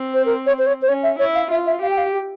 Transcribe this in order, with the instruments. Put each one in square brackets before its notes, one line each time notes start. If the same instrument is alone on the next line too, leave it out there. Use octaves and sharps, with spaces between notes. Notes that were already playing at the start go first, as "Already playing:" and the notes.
Already playing: [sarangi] C4
[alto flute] C5
A#4
C#5
C5
C#5
C5
[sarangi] C#4 [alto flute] C#5
[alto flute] E5
[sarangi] E4 [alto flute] C#5
[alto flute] F5
[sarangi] F4 [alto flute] E5
[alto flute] E5
[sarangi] G4 [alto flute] F5
[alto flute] G5
F5
G4